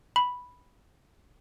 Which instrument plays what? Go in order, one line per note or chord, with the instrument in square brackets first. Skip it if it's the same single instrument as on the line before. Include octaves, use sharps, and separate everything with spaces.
[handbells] B5